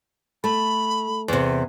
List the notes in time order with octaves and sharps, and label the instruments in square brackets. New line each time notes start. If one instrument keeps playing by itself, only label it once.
[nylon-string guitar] A3 [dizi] B5
[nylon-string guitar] E2 C3